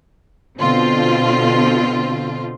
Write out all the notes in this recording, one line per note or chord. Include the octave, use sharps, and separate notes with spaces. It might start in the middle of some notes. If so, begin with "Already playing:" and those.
B2 D3 C4 F4